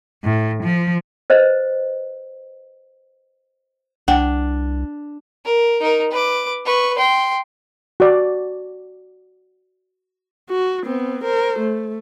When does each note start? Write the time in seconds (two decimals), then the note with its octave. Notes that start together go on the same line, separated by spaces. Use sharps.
0.24 A2
0.64 F3
1.30 B4 C5 D#5
4.08 C2 D4 F#5 G5
5.45 A#4
5.81 D#4 A#4
6.11 B4 D6
6.65 B4 C#6
6.98 G5 C6
8.00 F#4 D5
10.50 F#4
10.84 B3 C4
11.24 A#4 C5
11.59 A3